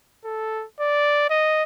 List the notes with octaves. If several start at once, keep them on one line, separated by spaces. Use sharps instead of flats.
A4
D5
D#5